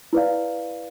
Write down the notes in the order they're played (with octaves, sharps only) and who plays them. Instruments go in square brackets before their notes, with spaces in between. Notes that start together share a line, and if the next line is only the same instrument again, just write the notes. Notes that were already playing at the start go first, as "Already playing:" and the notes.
[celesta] E4 B4 D5 F5